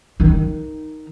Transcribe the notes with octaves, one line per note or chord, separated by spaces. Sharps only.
D#3 D#4